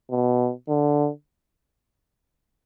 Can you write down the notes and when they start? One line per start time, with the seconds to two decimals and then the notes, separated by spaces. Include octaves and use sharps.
0.11 B2
0.69 D3